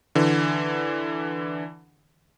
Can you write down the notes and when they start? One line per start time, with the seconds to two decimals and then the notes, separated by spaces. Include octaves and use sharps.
0.15 D3 E3